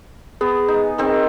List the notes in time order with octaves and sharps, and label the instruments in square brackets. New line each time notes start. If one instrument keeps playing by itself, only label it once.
[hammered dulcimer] B3 [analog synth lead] G#4
[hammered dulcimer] D#4
D#3 C4